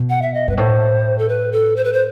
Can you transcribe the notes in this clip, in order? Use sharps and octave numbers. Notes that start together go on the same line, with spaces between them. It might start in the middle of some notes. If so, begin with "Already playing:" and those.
Already playing: B2
F#5
E5
D#5
G2 B4
A2 C5
A4
B4
A4
C5
B4
C5